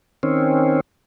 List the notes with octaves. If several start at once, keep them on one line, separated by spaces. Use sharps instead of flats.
D#3 C4 C#4